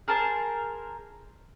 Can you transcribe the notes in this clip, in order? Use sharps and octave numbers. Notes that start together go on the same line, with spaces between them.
G#4 A#4 C5 A5